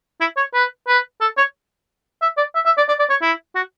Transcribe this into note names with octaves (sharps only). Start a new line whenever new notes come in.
E4
C#5
B4
B4
A4
C#5
E5
D5
E5
E5
D5
D5
D5
C#5
E4
F#4